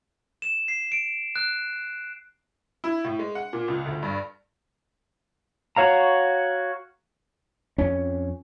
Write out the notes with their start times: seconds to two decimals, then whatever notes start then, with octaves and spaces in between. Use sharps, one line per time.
0.42 E7
0.68 C7
0.92 D7
1.36 F#6
2.84 E4
3.05 A2
3.19 G#3
3.35 F#5
3.53 A#2
3.68 C#2
3.85 D2
4.02 G2
5.76 F#4 C#5 F5 A#5
7.78 F2 C#4